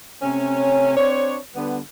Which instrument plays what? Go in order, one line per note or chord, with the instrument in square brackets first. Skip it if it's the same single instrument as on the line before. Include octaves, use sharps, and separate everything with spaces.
[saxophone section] C3 A3 C#4
C4 D4 C#5
D3 G3 B3